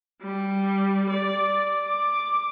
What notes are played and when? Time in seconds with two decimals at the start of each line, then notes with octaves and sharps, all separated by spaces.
0.22 G3
1.10 D5
1.85 D6